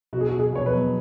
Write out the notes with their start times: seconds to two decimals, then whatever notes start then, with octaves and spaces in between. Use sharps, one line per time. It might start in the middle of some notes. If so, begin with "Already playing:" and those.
0.13 B2 F#4
0.21 G#4
0.29 B2 F#4
0.39 G#4
0.53 B2 C#5
0.66 B4
0.73 F#3